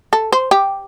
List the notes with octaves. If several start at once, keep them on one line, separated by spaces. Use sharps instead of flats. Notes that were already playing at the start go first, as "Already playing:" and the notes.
A4
C5
G4